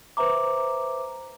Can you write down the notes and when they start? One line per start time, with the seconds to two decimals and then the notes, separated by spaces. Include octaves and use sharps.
0.17 B4 C5 E5 A#5 D6